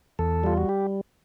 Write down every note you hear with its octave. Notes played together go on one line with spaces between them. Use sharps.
E2 A4
G3 F4
F#4
G4